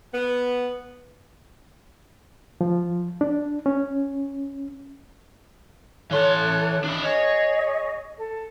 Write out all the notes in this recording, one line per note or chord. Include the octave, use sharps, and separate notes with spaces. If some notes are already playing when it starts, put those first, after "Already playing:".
B3
F3
D4
C#4
E3 A4 C#5 C6 F#6
D4 E4
G#4 C#5 D#5
A4